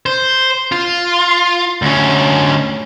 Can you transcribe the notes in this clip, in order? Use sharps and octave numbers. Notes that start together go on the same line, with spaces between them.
C5
F4
D2 C#4